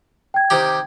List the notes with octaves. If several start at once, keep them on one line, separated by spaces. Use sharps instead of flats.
G5 G#6
C3 D#3 G4